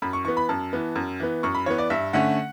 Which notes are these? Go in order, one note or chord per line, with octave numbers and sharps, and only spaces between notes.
F#2 B5
C#6
E3 B3 C#6
B5
F#2 A5
E3 B3
F#2
E3 B3
F#2 C#6
B5
E3 B3 C#5
D5
G2 E5
D3 A3 C#4 F#5